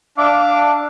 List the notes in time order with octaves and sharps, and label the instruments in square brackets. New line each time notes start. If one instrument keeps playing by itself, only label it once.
[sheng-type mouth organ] D4 [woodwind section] E5 F5 D6